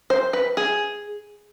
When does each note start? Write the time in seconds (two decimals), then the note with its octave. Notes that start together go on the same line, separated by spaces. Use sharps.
0.10 C5
0.33 B4
0.57 G#4